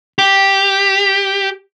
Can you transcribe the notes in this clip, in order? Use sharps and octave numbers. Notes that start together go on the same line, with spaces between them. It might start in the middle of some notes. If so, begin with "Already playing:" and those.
G4